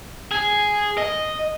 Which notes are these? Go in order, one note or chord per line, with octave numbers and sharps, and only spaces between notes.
G#4
D#5